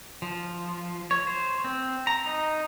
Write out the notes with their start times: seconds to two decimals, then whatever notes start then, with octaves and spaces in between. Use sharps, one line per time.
0.22 F3
1.11 C#5
1.27 C5
1.64 C4
2.07 A#5
2.26 D#4